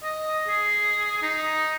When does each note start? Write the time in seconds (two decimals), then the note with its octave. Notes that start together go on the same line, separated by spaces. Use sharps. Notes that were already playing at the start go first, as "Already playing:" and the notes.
0.03 D#5
0.48 G#4
1.22 D#4